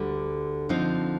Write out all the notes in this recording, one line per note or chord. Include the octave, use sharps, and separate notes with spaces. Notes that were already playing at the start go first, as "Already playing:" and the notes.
Already playing: D2 D3 G3
D3 F3 C4 D#4